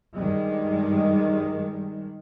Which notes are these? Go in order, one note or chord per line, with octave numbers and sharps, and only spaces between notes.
G2 D#3 G3 G#3